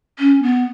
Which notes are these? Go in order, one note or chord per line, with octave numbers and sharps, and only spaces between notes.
C#4
B3